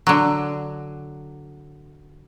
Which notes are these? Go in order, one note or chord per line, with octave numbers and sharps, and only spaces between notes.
D3 F#3